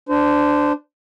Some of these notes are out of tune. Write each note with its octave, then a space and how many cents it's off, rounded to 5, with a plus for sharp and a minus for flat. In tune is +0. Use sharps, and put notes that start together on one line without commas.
D4 +0 C5 -25